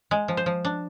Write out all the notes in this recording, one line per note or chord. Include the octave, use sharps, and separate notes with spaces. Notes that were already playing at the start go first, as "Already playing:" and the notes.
G#3
F3
C5
F3
D4